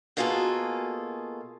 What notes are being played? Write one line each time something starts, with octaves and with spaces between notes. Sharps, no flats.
B2 A#3 F4 F#4 G#4 A4